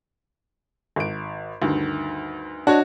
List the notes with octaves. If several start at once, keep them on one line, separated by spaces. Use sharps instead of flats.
G#1 D7
D2 G2 D#3
D4 F#4 C#5 D#5